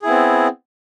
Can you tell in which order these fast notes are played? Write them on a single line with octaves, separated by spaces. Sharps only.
G#4 E4 B3 C4